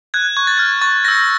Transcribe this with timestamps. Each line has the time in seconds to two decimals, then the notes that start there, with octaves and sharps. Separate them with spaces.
0.14 F#6 G#6
0.37 C#6 G#6
0.47 A6
0.57 F6 G#6
0.81 C#6 A6
1.05 E6 G6 A#6